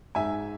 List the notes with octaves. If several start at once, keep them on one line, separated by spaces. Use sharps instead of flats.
G#2 E5 G#5